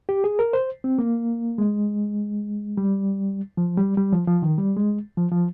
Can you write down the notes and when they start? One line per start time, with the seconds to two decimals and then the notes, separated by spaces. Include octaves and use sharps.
0.09 G4
0.24 G#4
0.39 A#4
0.53 C5
0.84 C4
0.99 A#3
1.58 G#3
2.77 G3
3.57 F3
3.77 G3
3.97 G3
4.12 F3
4.28 F3
4.42 D#3
4.58 G3
4.77 G#3
5.17 F3
5.32 F3